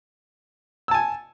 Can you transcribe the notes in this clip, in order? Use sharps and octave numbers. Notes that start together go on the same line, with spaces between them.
G#5 A5 E6